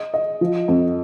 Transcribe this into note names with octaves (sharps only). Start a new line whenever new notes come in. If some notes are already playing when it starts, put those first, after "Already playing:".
Already playing: G#4 D#5
D#5
F3
F2